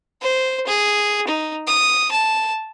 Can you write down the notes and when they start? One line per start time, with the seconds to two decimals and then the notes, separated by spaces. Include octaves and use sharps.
0.22 C5
0.67 G#4
1.27 D#4
1.67 D#6
2.11 A5